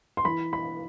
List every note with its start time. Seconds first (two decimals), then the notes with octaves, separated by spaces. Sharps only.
0.17 C6
0.25 E3 B5
0.53 B5